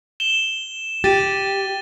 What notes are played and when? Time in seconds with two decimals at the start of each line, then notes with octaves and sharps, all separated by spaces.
0.20 E7 G7
1.04 G4 A6 D#7